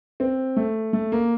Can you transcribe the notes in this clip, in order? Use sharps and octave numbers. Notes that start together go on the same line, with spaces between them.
C4
A3
A3
A#3